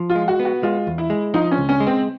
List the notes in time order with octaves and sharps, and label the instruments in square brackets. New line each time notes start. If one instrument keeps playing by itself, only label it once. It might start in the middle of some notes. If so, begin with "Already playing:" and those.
Already playing: [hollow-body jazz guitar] F3
[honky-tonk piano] F4
[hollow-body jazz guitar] G#3
[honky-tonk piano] F#4
[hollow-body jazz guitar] B3
[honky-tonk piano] F#4
[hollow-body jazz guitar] G#3 [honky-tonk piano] F4
[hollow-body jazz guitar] E2
[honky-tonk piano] E4
[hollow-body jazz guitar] G#3
[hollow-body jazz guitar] F3 [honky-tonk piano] D#4
[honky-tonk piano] C#4
[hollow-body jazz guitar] C#2
[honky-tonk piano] C#4
[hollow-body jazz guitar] G#3
[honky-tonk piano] C4